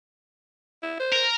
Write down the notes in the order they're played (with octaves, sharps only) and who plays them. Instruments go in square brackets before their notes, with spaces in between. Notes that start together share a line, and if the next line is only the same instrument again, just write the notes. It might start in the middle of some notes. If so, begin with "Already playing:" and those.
[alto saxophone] E4
C5
[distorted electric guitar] A#4